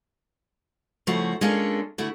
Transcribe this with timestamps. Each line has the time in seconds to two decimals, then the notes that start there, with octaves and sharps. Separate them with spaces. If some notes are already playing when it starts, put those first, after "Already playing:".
1.07 C#3 F3 A3 E4 F#4
1.41 G#3 A#3 C#4 D4 F4 A4
1.98 D3 A3 E4 F#4